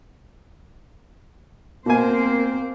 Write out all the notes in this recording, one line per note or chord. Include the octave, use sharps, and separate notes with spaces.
B2 A#3 C4 A#4 C5 G#5